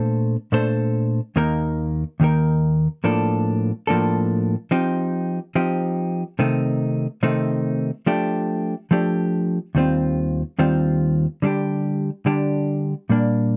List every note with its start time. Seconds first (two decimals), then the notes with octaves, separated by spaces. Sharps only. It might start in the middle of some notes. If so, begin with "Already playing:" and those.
Already playing: A#2 A3 D4 A4 C5
0.52 A#2 A3 D4 A4 C5
1.36 D#2 D#3 A#3 D#4 A#4
2.20 D#2 D#3 A#3 D#4 A#4
3.04 A2 F3 A#3 D4 A4
3.87 A2 F3 A#3 D4 A4
4.71 F3 C4 D#4 G4
5.55 F3 C4 D#4 G4
6.39 C3 D#3 A3 C4 D#4
7.23 C3 D#3 A3 C4 D#4
8.06 F3 A3 D4 G4
8.91 F3 A3 D4 G4
9.75 D#2 D#3 G3 C4 F4
10.58 D#2 D#3 G3 C4 F4
11.42 D3 G3 D4 G4
12.26 D3 G3 D4 G4
13.09 A#2 G3 A#3 D4